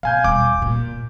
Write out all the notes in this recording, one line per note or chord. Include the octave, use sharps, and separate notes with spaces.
B2 F5 G#5 G6
D#1 D6
A#2